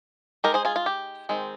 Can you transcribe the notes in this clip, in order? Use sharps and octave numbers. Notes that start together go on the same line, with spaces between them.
G#3 D#4 G4 A#4
G#4 C5
F4 G#4
F4
G4
D#3 G#3 C4